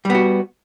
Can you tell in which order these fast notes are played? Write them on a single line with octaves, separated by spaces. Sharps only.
G3 B3 F#4